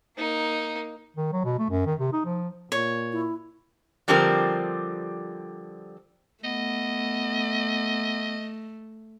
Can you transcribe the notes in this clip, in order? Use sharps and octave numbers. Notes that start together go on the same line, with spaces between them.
A#3 D#4
D#3
F#3
B2
A3
F#2
D#3
C3
D#4
F3
A#2 C#5
E4
D3 F3 G3 C4 G4 A#4
A3 B3 D#5